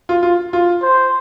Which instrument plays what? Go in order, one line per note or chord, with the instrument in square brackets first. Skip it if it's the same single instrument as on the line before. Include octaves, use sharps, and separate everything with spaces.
[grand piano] F4
F4
F4
[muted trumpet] C5